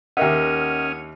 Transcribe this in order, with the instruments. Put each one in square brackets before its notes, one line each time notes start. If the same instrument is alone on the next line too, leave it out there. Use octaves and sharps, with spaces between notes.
[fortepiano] D#2 E5 [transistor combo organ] C#4 D#6 F6 [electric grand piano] A#4 D#5 F#5